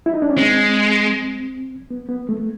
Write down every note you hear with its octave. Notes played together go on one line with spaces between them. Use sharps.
E4
D#4
D4
C#4
G#3 C4
B3
B3
A3
A3